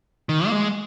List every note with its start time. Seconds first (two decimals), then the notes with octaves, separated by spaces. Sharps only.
0.29 D#3
0.47 A#3
0.52 G#3